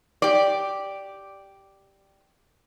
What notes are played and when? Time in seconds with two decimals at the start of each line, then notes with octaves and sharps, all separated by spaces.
0.22 G4 D5